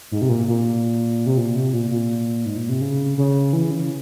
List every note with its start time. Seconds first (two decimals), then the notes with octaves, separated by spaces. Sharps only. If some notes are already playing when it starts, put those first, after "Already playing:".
0.12 G#2
0.22 C3
0.29 A#2
0.48 A#2
1.26 C3
1.37 A#2
1.55 C3
1.73 A#2
1.91 A#2
2.45 G#2
2.57 A#2
2.69 C3
2.81 C#3
3.18 C#3
3.53 E3
3.71 C#3